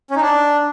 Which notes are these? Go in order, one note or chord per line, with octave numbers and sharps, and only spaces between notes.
C#4
D#4
D4